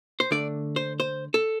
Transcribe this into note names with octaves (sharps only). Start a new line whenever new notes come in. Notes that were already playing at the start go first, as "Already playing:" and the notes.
C5
D3 A3 D4 D5
C5
C5
A4